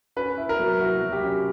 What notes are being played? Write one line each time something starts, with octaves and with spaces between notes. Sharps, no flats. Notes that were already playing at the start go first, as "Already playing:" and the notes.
C#4 B4
E4
A#4
F#3
E4 F#4
F#3
G4
C#4